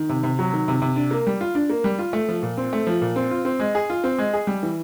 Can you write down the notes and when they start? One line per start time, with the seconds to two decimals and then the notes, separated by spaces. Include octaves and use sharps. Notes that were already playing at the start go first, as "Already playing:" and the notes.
Already playing: D#3
0.09 C3
0.23 C3
0.39 F#3
0.53 D#3
0.68 C3
0.82 C3
0.96 D4
1.11 A#3
1.27 G3
1.41 F4
1.55 D4
1.70 A#3
1.84 G3
1.99 F4
2.13 A3
2.29 F3
2.43 A#2
2.57 C4
2.73 A3
2.87 F3
3.02 A#2
3.16 C4
3.31 F4
3.45 C4
3.59 G#3
3.75 G#4
3.90 F4
4.04 C4
4.18 G#3
4.34 G#4
4.47 G3
4.63 E3